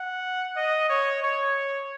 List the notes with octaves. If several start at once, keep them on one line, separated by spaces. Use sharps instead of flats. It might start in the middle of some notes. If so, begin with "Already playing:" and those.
Already playing: F#5
D#5
C#5
C#5